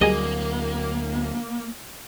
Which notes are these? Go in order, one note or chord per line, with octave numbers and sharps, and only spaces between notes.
D2 F#3 G3 A#3 G#4 D#5 G#5